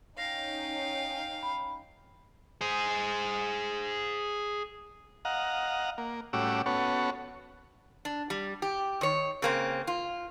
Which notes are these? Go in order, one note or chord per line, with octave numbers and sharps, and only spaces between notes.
C#4 D#4 F5 G5 A#6
B5
G#4 C5
D#5 F5 F#5 A#5
A#3
A2 G3 C#4 F#4 D6 E6
B3 C#4 F#4 A4 C#5
D4
G3
G4
D#3 C#5
C#3 A#3 C4
F4